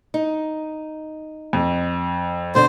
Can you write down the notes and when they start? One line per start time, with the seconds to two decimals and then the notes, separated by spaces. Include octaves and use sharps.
0.14 D#4
1.53 F2
2.55 B2 D3 C4 C5